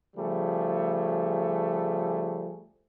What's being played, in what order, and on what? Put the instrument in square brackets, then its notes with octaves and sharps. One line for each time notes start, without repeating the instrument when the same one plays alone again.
[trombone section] C#3 F3 G3 A3 G#4